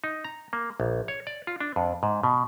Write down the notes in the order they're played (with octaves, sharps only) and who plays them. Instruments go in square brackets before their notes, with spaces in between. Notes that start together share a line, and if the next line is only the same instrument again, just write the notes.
[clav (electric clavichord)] D#4
A#5
A#3
A#1
C#5
D5
F4
D4
F2
G#2
B2